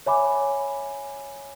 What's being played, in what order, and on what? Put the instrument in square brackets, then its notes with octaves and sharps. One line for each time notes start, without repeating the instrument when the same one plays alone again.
[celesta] C#5 E5 G#5 B5 D6